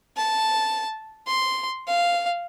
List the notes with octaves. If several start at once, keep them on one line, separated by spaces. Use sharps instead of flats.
A5
C6
F5